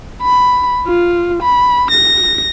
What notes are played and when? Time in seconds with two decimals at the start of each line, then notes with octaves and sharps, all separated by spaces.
0.22 B5
0.87 F4
1.43 B5
1.91 A#6